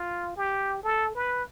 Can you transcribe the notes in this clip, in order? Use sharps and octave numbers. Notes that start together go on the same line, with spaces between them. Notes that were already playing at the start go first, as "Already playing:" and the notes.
Already playing: F4
G4
A4
B4